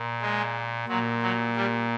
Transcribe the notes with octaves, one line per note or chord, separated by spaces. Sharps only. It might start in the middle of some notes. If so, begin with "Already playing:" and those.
Already playing: A#2
G#3
A#2 F#3
F#3
G3